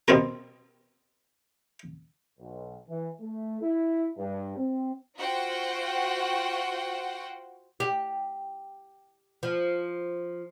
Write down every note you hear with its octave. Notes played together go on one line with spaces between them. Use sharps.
B2 B3 C4 A#4
B1
E3
A3
E4
G2
C4
F4 F#4 C5 F#5 G5
G4
F3